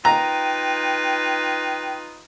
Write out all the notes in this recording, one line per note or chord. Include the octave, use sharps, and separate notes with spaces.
D#4 F4 B4 G5 A#5